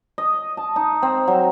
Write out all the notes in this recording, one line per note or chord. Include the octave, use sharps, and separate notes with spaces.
D#5
A5
D#4
C4
F#3